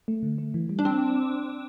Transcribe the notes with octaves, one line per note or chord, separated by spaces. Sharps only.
A3
D3
A3
E3
G3
D4
C4